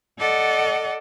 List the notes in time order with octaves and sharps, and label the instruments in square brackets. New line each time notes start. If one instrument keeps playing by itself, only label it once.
[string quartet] A4 D5 D#5 F#5